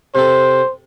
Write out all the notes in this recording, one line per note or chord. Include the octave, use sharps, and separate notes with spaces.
C3 C4 A4 C5